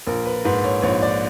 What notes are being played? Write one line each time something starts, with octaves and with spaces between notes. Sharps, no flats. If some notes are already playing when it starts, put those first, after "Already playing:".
A#1 A#4
B4
G#2 B4
C#5
A#1 C#5
D5